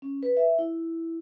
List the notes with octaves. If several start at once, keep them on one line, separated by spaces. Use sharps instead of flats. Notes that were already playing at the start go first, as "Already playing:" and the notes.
C#4
B4
E5
E4